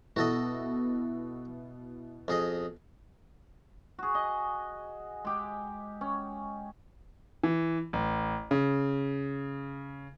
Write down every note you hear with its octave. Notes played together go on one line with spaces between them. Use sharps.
B2 B3 E4 F#4 A4 D#5
F2 G#4 D#5
F#4 G#4
D#5
G#3 G4
C#4
E3
A1
C#3